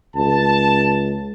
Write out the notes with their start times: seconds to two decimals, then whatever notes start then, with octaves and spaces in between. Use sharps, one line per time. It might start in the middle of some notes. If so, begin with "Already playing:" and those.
0.16 C#2 A5